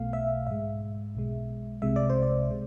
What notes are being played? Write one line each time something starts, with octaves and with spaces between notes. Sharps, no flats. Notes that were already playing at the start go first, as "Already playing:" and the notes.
Already playing: B1 B2 A3 F5
E5
G#2 G#3 E5
B1 B2 G#3
C2 C3 G#3 E5
D5
C5
D5
C3 G#3